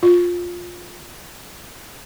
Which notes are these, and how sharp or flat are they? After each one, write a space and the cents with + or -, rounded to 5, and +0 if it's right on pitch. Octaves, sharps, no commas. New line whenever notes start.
F4 +15